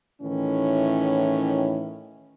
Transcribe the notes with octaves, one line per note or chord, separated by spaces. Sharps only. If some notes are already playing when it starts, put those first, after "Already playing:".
A2 D#3 E3 C#4